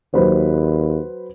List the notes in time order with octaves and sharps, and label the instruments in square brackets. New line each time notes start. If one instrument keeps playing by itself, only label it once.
[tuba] D#2 [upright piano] F#3 B4 C5